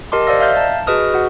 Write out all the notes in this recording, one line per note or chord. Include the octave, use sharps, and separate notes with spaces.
G4 A#4 D#5 A5 C6 D6
C5 D5 D#5 F5 E6 A#6
E5 F5 F6 G6 A6
A5 A#5
F#4 G#4 B4 D#5 D#6 F6
F#4 F#5